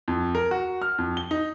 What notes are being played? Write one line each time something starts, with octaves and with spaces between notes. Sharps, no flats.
F2
A#4
F#4
F6
F2
G7
D#4